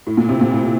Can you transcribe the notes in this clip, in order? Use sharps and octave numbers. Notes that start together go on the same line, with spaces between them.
A2
A#2
C3
A#2
A2